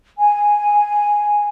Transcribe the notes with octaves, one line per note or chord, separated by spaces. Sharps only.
G#5